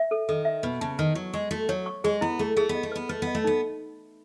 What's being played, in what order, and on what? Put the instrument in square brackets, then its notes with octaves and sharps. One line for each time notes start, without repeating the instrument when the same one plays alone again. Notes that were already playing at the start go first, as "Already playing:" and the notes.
Already playing: [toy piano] E5
A4
[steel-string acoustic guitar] D#3 [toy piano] A4
[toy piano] E5
[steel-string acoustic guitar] B2 [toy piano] B4
[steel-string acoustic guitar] C#3 [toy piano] A5
[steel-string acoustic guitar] D#3 [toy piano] B4
[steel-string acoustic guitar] F#3 [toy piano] C#6
[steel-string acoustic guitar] G#3 [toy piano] C#6
[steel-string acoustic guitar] A3 [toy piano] F#4
[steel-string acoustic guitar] F#3 [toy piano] C#5
[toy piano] C#6
[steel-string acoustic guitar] G#3 [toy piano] G#4
[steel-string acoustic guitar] B3 [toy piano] E4
[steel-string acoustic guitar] A3 [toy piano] G#4
[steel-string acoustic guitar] A3 [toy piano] G#4
[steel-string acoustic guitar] B3
[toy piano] D#5
[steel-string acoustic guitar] A3
[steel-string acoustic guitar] B3 [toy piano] B4
[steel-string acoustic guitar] A3 [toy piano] B4
[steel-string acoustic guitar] B3
[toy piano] D#5
[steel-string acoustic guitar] A3
[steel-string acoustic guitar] B3 [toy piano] D#4